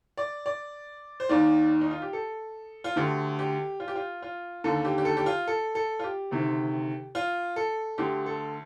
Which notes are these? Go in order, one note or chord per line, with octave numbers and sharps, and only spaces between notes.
D5
D5
C5
D#2 D#3 D5
D#4
F4
G4
A4
F4
D2 D3 G4
G4
F4
G4
F4
F4
D#2 D3 A4
G4
G4
A4
G4
F4
A4
A4
F4
G4
D2 C3 D#3
F4
A4
D2 D3 G4
A4